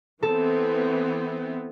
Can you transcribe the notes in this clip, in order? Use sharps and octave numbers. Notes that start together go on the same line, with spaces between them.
E3 B3 C4 A4